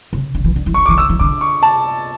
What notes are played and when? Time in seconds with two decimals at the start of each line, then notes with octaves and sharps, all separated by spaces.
0.13 C#3
0.35 D3
0.44 E3
0.56 D3
0.66 E3
0.74 D3 C#6
0.86 E3 D6
0.98 D3 E6
1.10 E3
1.19 D3 D6
1.41 C#6
1.63 A5